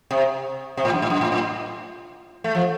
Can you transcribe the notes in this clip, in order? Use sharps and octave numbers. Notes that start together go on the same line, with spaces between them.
C3
C3
A2
F#2
A2
F#2
A2
A2
A3
F3